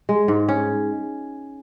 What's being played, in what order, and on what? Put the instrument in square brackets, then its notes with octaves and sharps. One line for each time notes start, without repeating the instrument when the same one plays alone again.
[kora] G#3
G#2
C#4